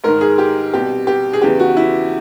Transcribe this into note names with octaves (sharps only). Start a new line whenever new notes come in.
G#2 D#3 A#4
G#4
G4
C2 B2 G4
G4
G#4
E2 C#3 E3 G4
F#4
E4